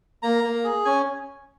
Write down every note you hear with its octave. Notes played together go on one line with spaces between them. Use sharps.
A#3 A#5
A#3
G#4
C#4 G#5